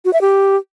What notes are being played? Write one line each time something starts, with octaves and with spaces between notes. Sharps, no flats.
F#4
E5
G4